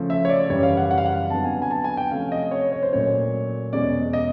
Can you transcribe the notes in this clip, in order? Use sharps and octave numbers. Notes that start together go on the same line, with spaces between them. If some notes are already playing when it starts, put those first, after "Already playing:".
Already playing: C#3 F3 A3 C#4
E5
C#5
D5
F#2 C#3 E3 G3 C#5
F5
F#5
F#5
F5
F#5
F2 D3 F#3 B3 A5
G#5
G#5
A5
G#5
G5
C3 F3 A3 C#4 F5
D#5
C#5
C#5
C5
A#2 F#3 A3 C#4 C#5
E2 B2 G#3 C#4 D5
D#5